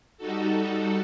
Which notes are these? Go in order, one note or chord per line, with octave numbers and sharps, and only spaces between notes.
G3 D#4 F#4 A4